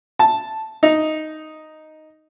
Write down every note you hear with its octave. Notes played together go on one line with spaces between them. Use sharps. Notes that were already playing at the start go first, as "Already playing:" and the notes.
A5
D#4